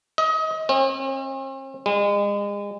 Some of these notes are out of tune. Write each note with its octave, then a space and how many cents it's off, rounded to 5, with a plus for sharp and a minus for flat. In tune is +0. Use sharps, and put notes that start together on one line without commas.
D#5 +30
C4 +45
G#3 -35